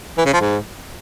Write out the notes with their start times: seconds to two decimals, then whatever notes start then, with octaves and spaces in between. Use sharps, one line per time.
0.18 E3
0.26 C#3
0.33 F3
0.41 G#2